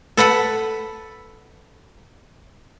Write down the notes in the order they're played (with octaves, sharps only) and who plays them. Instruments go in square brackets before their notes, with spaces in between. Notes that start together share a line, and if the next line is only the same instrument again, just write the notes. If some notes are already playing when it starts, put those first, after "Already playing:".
[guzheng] A4 B4 F#5 B5